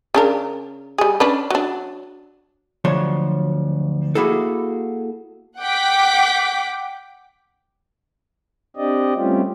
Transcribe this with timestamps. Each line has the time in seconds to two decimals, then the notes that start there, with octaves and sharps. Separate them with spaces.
0.14 C#3 D4 A#4
0.98 G3 G#4
1.20 C#4 D4 B4
1.50 F#3 D4
2.85 D2 F3 F#3 C#5 C6
4.15 A#3 E4 F#4 G#4 A4
5.60 F#5 G5 D6 B6
8.76 C4 D4 G4 D5 D#5
9.15 G3 A3 C4 C#4 F4 G4